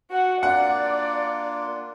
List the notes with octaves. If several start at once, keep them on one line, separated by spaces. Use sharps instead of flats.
F#4 F#5
A#3 D4 F4 D5 F#5